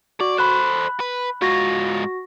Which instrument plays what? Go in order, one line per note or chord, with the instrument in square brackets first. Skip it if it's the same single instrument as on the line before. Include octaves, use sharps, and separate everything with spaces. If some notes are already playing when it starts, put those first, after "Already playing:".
[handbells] F#4 [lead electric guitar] D5
[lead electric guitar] A4 C5 [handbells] B5 F#6
[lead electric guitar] B4
[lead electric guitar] G#2 F4 [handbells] F#4 A#6